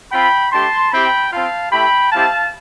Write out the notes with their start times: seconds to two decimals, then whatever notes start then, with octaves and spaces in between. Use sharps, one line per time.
0.12 C4 F4 G5 B5
0.52 A3 D4 G4 A5 C6
0.92 C4 E4 G4 G5 B5
1.32 C4 F4 F5 A5
1.72 A3 E4 G4 G5 B5
2.12 G3 C4 E4 G4 F5 A5